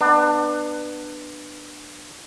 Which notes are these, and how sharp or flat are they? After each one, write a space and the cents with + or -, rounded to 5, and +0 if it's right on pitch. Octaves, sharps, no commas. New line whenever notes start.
B3 +0 D4 +25